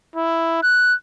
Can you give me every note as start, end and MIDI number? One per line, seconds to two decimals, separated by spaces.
0.16 0.58 64
0.63 0.94 90